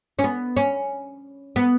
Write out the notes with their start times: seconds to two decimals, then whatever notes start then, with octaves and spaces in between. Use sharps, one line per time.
0.19 C#4
0.24 B3
0.57 C#4
1.56 B3